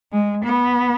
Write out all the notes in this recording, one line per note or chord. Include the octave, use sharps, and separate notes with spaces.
G#3
B3